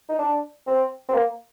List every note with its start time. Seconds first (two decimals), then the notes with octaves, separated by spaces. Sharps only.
0.09 D#4
0.19 D4
0.67 C4
1.09 C4
1.14 A#3